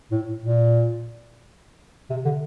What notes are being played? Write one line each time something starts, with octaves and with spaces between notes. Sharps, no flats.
A2
A#2
C3
D3